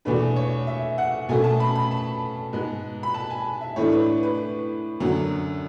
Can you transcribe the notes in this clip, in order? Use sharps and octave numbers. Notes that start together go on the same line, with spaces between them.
E2 B2 A3 D4 B4
C#5
E5
F#5
B2 A3 C#4 G#5
A5
B5
B5
A5
G#2 G#3 B3
B5
A5
G#5
E5
A2 E3 A3 D4 C#5
B4
B4
F#2 D3 F#3